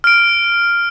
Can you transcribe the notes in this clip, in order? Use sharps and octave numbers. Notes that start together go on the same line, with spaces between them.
F6 D7